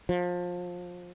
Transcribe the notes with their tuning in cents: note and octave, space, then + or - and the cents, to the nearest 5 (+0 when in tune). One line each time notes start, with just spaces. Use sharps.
F3 +25